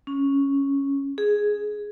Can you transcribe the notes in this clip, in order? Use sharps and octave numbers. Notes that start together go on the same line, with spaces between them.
C#4
G#4